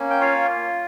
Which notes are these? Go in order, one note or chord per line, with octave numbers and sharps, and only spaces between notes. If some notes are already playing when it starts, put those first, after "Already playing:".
Already playing: A#3 C#4
G5
F4 C#5 F5